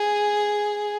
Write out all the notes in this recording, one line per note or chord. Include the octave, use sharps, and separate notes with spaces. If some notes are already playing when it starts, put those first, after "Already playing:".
Already playing: G#4